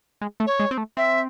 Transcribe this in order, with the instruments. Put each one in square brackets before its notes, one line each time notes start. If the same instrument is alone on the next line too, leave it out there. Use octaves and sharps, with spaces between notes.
[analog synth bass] G#3
A3
[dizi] C#5
[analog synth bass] G#3
C4
A3
[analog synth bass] C4 [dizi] E5